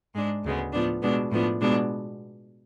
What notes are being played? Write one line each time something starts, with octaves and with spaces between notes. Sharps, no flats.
G#2 G#3 D4
D2 C#3 G#3 B3
A2 F3 B3 D4
B2 G#3 B3 D4
A2 F3 B3 D4
B2 G#3 B3 D4